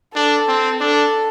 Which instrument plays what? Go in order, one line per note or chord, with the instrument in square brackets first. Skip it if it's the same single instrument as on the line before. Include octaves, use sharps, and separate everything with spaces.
[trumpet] D4 [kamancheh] A4
[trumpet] C4
[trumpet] D4 [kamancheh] A4